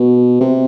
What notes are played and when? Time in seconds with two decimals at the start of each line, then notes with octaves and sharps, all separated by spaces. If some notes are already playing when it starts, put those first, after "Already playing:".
Already playing: B2
0.41 C3